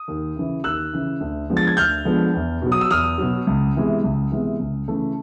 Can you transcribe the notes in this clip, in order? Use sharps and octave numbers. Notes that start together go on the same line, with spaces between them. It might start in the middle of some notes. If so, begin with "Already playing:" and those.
Already playing: D#6
D#2
C#3 E3
D#2 E6 F#6
C#3 E3
D2
D3 F3 G#3 B3
A6
G#6
D2 F6 G6
D3 F3 G#3 B3
E2
B2 F#3
D#6
E6
E2 D#6 F6
B2 F#3
C#2
C3 E3 G#3 B3
C#2
C3 E3 G#3 B3
C#2
C#3 E3 A3